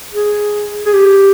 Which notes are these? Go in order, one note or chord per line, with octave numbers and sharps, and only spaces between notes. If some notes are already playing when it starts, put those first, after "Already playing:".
G#4
G#4
G4